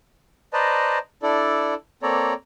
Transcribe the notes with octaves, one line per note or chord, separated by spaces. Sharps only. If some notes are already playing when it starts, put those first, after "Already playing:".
B4 C5 D5 D#5 A5 A#5
D4 E4 A4 D5
A#3 C4 A4 C#5 D5 A#5